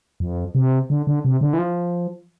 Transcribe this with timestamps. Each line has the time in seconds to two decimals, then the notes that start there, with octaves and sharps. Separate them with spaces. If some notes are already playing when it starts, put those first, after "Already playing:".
0.20 F2
0.55 C3
0.90 D3
1.07 D3
1.25 C3
1.41 D3
1.53 E3
1.58 F3